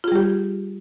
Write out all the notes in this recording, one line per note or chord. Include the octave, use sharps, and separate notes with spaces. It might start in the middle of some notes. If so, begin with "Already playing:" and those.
G3 F4 G4 G#4